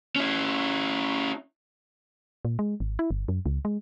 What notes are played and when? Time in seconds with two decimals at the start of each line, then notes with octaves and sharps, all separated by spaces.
0.16 C#4 E4
2.45 A#2
2.59 G#3
2.80 G#1
2.99 E4
3.11 G1
3.28 F#2
3.46 C#2
3.65 G#3